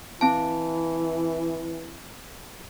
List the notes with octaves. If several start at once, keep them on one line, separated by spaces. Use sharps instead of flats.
E3 C4 A5